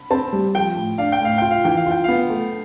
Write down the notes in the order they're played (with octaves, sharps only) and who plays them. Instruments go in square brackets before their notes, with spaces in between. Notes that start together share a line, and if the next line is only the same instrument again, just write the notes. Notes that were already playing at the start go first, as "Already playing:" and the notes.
Already playing: [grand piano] B5
[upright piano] C4 [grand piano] A5
[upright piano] G3
[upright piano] F3 [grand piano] G5
[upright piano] A2
[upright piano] D4 [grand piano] F5
[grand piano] G5
[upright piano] A2 [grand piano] F5
[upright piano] F4 [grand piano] G5
[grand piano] F5
[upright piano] E3 [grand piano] G5
[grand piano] F5
[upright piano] F4 [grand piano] G5
[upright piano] B3 [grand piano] F5
[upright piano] A3